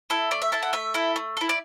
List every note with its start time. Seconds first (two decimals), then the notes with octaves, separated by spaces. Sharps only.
0.10 E4 A4
0.31 A3 D5
0.42 E5
0.52 E4 A4 A5
0.63 F#5
0.73 A3 E5
0.94 E4 A4
1.16 A3
1.37 E4 A4
1.49 D5